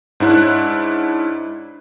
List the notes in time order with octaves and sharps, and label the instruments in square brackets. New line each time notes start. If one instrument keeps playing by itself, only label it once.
[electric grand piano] G#2 D4 E4 C#5 F#6